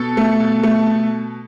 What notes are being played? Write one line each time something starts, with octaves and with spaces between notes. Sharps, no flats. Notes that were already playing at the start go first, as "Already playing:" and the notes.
Already playing: B2 A4
A3
B2
A3
B2